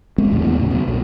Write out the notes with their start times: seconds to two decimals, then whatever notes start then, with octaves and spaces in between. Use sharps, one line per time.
0.18 G#3 B3 C4
0.30 A#1 E2 A2 D3
0.44 D#1 E2 B3
0.58 D#2 A2 C#3
0.71 B2 F#3
0.88 B1 A#2